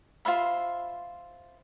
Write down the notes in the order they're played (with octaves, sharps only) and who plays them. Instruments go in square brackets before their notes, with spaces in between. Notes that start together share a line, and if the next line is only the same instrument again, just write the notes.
[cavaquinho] F4 C5 E5 B5